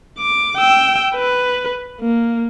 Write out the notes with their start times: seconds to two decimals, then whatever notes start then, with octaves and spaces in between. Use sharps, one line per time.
0.18 D6
0.58 G5 E6
1.15 B4
2.01 A#3